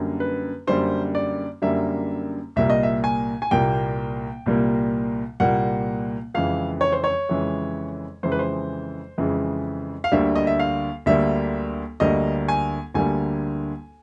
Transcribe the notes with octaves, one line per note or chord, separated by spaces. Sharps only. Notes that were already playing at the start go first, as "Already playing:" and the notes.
Already playing: F#2 D3 G3 A#3
B4
F#2 D3 G3 A#3 C5
D5
F#2 D3 G3 A#3 E5
C2 A#2 G3 A#3 E5
D#5
E5
G#5
G#5
C2 A#2 G3 A#3 G5
C2 A#2 G3 A#3
C2 A#2 G3 A#3 F#5
F2 C#3 E3 G#3 F5
C#5
C5
C#5
F2 C#3 E3 G#3
F2 C#3 E3 G#3 C5
B4
C5
F2 C#3 E3 G#3
F5
D2 D3 G3 A#3 E5
D#5
E5
F5
D2 D3 G3 A#3 E5
D2 D3 G3 A#3 D#5
G#5
D2 D3 G3 A#3 G#5